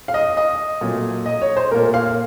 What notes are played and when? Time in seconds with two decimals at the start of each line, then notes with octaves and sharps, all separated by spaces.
0.08 F5
0.14 D#5
0.37 D#5
0.81 A#2 F#3 A3
1.26 D#5
1.42 C#5
1.57 C5
1.71 A#2 A3 A#4
1.94 F5